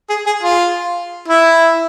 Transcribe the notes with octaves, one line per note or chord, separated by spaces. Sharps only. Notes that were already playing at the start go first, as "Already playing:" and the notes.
G#4
G#4
F4
E4